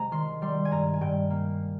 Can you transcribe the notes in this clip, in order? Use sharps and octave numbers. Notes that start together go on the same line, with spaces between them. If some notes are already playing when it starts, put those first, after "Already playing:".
Already playing: C3 G#3 G#5 A#5
D#3 C6
G3 C6
G#5
G2 A#5
G#5
G2 G5
A#3